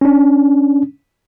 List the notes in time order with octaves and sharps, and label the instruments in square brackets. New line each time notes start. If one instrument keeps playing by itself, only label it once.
[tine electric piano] C#4 D4